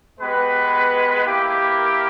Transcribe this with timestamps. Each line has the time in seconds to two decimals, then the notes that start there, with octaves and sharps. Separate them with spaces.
0.20 G#3 B3 G4 B4
1.25 A#3 E4 G4
1.78 A#4